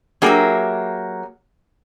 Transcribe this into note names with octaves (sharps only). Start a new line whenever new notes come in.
F#3 A#3 G4 G#4 A#4 E5